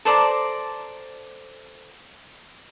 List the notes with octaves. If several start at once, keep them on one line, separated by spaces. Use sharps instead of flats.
A4 C5 D5 A#5